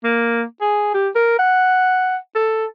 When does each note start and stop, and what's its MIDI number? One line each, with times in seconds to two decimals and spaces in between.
0.04 0.44 58
0.61 0.91 68
0.94 1.09 67
1.16 1.34 70
1.39 2.17 78
2.35 2.66 69